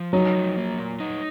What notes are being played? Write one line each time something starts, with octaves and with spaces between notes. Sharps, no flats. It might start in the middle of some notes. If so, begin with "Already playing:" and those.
Already playing: F3
F#3 D#4
F3
A#3
A#2
D#4